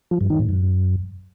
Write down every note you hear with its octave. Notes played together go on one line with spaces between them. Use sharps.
F3
G2
D#3
A2
F#2